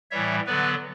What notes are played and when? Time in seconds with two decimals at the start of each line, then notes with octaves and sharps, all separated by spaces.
0.11 A2 E3 G3 C#5 E5
0.46 D3 F#3 B3 B4 D5